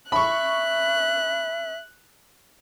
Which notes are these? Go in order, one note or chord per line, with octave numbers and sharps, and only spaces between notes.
E5 B5 C#6 F#6